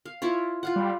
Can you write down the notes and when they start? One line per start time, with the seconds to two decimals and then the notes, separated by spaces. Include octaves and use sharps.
0.05 F5
0.22 E4 F4 C#5
0.63 F4 F5 F#5
0.76 G3